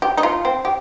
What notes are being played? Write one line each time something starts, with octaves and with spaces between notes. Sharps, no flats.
G4
D#4
F4
C4
G4